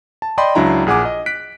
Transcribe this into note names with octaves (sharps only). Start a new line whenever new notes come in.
A5
D5 D#5 G5 B5 C6
C#2 F#3 D4 E4 A#5
A#1 G#4 F#5 G#5 D6
D#5
F#6 B6 D7